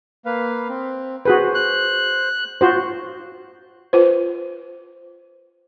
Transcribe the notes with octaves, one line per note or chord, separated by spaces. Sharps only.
A#3 B4 F5
C4
F#4 G#4 B4 C5
F#6
F4 F#4 C5
F4 B4 C5